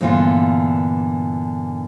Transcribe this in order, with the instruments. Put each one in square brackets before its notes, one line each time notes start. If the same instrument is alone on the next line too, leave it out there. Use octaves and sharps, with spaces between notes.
[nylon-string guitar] G2 A#2 D3 E3 B3 F4